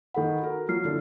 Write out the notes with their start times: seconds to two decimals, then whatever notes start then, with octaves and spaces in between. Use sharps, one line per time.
0.14 D#3 A4 F#5 B5
0.41 F#4 A#4
0.69 F3 F#3 F6 C7
0.85 D3 E4 A4